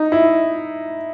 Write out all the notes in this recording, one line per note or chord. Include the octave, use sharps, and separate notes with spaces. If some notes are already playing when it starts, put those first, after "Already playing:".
Already playing: D#4
E4